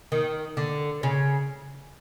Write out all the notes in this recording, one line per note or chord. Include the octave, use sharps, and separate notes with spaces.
D#3
D3
C#3